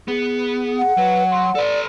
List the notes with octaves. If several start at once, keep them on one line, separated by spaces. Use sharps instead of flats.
B3 G#4
F#5
F#3 B4
C6
A4 B4 D5